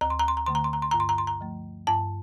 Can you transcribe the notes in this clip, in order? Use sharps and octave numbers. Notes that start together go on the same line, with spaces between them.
D2 A#5
C6
A#5
C6
A#5
D3 A3 C6
A#5
C6
A#5
C6
G2 A#5
C6
A#5
C6
A#5
F3 A3
G2 A5